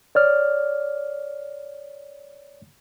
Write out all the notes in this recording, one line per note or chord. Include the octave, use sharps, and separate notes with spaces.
C#5 D5 F6